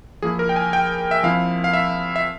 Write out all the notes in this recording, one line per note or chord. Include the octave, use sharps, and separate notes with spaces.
F3 A#3 E4 G#4
A#4
G5
G#5
G5
E5
F3 C4 E4 F5
F5
E5
E5